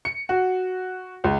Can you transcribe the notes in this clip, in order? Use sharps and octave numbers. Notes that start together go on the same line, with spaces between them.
C#7
F#4
C#2